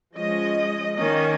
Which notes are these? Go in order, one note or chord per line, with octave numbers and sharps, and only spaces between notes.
F3 G#3 C#4 D#5
D#3 A#3 C#4 D#5